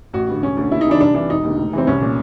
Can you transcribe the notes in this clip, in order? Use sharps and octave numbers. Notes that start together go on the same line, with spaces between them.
A1 F#4
G2 D3
E1 C#4
D2 D3
D#2 E4
D#4
C#3 E3 D4
C2 D4
C3 E3 D4
E1 D#4
D#2 D3
F1
F2 C3 E3 C4
C2 C#4
A#2